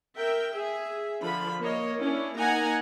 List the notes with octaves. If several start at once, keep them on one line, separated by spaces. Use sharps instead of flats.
A#4 E5 G5
G#4 E5
D3 F3 B5
A#3 C#5 D#5
C#4 D4 E4
A#3 D#4 F#5 G#5 A#5